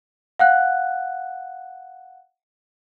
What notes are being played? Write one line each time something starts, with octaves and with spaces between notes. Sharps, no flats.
F5 F#5 F#6